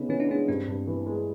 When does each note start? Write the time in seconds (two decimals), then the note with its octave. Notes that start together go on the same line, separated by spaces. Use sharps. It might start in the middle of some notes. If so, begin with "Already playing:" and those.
Already playing: C#3 B3 D#4
0.09 E3 C#4
0.20 D4
0.29 G#3 C#4
0.48 G2 C4
0.67 G2
0.87 E3
1.07 G#3